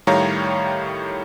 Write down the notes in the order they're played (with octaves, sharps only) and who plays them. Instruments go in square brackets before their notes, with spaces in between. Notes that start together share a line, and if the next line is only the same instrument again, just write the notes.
[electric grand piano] A2 D#3 G3 C#5 F5 A#5